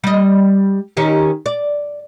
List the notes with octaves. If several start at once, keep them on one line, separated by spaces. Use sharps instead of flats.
G3 D#5
D#3 C#4 G4
D5